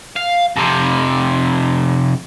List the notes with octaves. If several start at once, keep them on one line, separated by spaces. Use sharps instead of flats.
F5
F2 C3